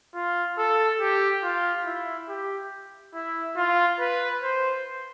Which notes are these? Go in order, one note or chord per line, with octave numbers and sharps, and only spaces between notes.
F4
A4
G4
F4
E4
G4
E4
F4
B4
C5